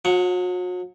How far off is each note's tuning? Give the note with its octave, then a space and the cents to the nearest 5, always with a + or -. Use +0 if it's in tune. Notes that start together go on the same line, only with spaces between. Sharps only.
F#3 -40 F#5 +0